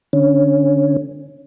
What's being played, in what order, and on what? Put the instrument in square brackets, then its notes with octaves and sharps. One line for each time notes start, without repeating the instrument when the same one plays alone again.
[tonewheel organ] D3 C#4